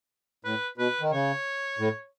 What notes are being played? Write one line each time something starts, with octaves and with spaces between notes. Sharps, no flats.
A2 B4
B2 B4
D#3
C#3 C#5
A2